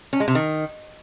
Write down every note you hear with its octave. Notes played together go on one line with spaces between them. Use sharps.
C#4
G#3
C3
D#3